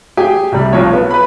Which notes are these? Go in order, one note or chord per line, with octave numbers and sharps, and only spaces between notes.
G4 G#4 G5 G#5
C2 C3 G3
B1 F3 C#5
B3
B4 B5